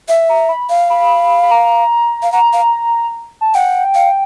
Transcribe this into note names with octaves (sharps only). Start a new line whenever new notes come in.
E5
A#5
B5
F5
B5
B5
A#5
F5
F#5 A#5
F5
A5
F#5 G5
F5